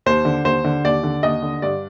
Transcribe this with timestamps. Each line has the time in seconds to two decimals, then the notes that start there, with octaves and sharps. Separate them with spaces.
0.06 D#2 C5
0.25 D3
0.44 D#2 C5
0.64 D3
0.85 D#2 D5
1.03 D3
1.23 D#2 D#5
1.42 D3
1.62 G2 D5